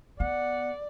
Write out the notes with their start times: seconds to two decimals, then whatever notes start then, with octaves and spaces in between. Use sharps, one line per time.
0.20 B3 D5 F#5